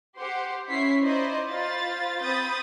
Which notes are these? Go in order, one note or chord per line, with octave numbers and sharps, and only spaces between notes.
G4 C5 F#5 C6
C#4 E4 B6 C7
D#4 E4 C5 D5 D#5
F4 C5 B5 A6
C4 B5 D#6 G6 A6